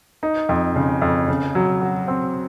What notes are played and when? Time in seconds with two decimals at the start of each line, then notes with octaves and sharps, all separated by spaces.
0.23 D#4
0.49 F2
0.76 C#3
1.02 F2
1.28 C#3
1.55 F#3
1.82 F#4
2.08 C4